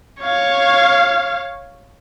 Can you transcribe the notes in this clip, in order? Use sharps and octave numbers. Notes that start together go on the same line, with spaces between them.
C#5 F5